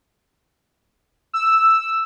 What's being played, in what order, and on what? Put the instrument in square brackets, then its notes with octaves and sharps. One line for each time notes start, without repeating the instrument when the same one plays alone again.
[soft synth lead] E6